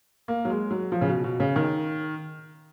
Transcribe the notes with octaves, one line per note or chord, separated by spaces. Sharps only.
A#3
F#3
G#3
F#3
F3
C#3
B2
B2
C#3
D#3